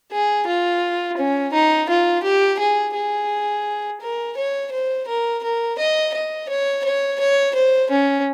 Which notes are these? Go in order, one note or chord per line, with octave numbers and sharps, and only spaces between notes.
G#4
F4
C#4
D#4
F4
G4
G#4
G#4
A#4
C#5
C5
A#4
A#4
D#5
D#5
C#5
C#5
C#5
C5
C#4